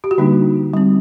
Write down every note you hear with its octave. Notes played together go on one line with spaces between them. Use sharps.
G4
F#4
D3 G3 A#3 D4 D#4
G3 C4